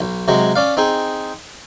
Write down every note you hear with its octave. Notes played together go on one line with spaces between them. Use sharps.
B1
C3 F#3 G#3
C#4 D5 F5
C4 D#4 G#4